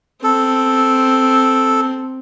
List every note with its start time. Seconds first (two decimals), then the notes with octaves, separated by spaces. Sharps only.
0.24 C4 A4